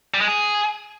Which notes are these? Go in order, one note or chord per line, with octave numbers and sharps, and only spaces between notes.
G3
G#3
G#4